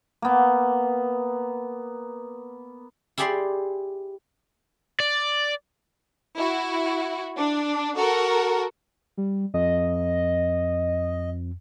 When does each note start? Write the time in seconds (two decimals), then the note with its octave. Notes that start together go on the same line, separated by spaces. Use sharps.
0.22 A#3 B3
3.18 E4 G4 G#4 D5 B5 C6
5.00 D5
6.37 E4 F#4
7.36 D4
7.96 F#4 A4 A#4
9.17 G3
9.54 F2 D#5